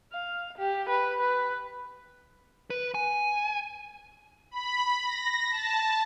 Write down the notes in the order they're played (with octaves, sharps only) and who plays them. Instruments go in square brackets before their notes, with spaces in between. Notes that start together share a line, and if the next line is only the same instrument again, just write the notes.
[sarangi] F5
G4
B4
B4
[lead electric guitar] B4
G#5
[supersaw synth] B5
A#6
A5